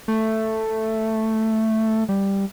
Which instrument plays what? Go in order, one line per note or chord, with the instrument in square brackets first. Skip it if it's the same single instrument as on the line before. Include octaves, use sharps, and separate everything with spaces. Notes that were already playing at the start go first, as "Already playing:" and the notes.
[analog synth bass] A3
G3